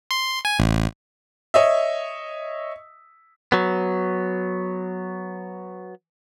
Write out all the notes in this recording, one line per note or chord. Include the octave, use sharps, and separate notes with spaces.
C6
G#5
A1
C#5 D#5 E5
F#3 B3